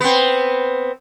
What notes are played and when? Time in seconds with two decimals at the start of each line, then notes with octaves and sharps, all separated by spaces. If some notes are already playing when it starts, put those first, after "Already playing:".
0.01 B3 C4